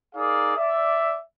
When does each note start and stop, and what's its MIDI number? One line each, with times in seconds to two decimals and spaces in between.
0.15 0.56 63
0.15 0.56 68
0.15 0.56 70
0.15 0.56 74
0.15 0.56 77
0.15 0.56 87
0.57 1.18 74
0.57 1.18 76